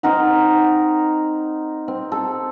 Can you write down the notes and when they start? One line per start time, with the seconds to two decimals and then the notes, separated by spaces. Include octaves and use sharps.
0.03 C4 D#4 A#4 F#5
1.88 C4
2.12 A4